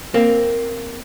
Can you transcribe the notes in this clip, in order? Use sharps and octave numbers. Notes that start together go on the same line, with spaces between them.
A#3 C4